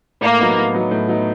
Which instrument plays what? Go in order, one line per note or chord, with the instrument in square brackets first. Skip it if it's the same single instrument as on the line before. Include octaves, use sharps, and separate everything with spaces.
[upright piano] A2 [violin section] A#3
[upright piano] F#3 B3 D#4
A2
F#3 B3 D#4
A2
F#3 B3 D#4